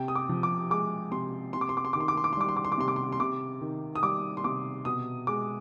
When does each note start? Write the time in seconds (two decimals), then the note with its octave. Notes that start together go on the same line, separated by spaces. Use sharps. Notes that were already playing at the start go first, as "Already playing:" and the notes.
Already playing: C3 G5
0.08 D#6
0.15 D6
0.29 F3
0.43 D6
0.70 G#3 D6
1.12 C3 C6
1.53 C3 C6
1.61 D6
1.69 C6
1.77 D6
1.85 C6
1.93 D#3 D6
2.00 C6
2.08 D6
2.17 C6
2.24 D6
2.33 C6
2.37 G3 D6
2.49 C6
2.57 D6
2.65 C6
2.72 D6
2.78 C3 C6
2.88 D6
2.96 C6
3.12 C6
3.20 C3 D6
3.61 D#3
3.95 D#6
4.02 G3 D6
4.37 C6
4.44 C3 D6
4.85 B2 D#6
5.27 G#3 D6